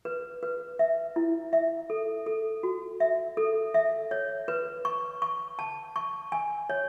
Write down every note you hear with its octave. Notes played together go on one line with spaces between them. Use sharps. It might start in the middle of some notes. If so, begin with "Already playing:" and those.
B4
B4
E5
E4
E5
A4
A4
F#4
E5
A4
E5
C#5
B4
C#6
C#6
A5
C#6
G#5
C#5